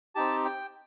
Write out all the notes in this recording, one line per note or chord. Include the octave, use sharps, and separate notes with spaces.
C4 D#4 G4 A5
G5